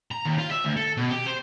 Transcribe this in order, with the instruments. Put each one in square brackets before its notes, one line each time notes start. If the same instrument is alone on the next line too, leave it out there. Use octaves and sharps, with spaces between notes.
[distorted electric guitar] A#5
D#2
F4
E5
D2
A4
B2
G4
C5